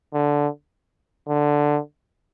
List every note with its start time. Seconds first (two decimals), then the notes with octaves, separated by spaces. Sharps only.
0.14 D3
1.28 D3